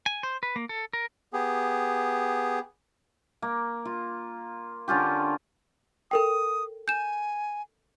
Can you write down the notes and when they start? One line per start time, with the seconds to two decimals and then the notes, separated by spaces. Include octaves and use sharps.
0.06 G#5
0.23 C5
0.43 B4
0.56 A#3
0.69 A4
0.93 A#4
1.33 B3 G4 G#4
3.42 A#3
3.85 F4
4.88 D3 C#4 F4 G4
6.11 A4 A#4 G5 D#6
6.88 G#5 G6 E7